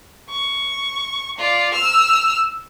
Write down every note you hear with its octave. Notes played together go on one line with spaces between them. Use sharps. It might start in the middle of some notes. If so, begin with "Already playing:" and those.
C#6
F4 D5
E6 F6